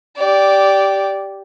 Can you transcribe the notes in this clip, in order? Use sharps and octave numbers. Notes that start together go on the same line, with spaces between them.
G4 D5